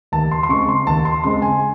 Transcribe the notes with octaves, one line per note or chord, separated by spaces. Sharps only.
D#2 A5
C6
C6
C#3 G#3 C4 C#6
C6
D#2 A5
C6
C#3 G#3 C4 C6
G#5